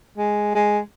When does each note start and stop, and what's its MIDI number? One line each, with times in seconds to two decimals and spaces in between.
0.18 0.53 56
0.55 0.79 56